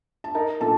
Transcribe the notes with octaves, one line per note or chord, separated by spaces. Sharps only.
A5
D#4 A#4 A#5
A#2 A4 A5